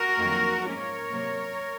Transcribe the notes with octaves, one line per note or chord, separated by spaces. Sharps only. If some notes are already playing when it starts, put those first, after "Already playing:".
Already playing: F#4 A#4
F2 D#3 F#3 A#3
G#2 F3 A#3 C#4 A#4 C#5
C3 F#3 A#3